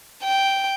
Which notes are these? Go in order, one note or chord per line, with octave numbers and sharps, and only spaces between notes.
G5